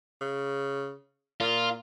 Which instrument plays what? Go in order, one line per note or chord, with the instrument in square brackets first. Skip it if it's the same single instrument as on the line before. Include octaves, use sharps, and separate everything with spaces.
[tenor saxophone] C#3
[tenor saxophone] A#2 [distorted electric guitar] F4